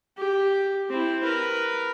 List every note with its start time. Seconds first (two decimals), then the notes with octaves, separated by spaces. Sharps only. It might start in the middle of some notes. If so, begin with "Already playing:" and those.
0.18 G4
0.89 C4 E4
1.23 A#4 B4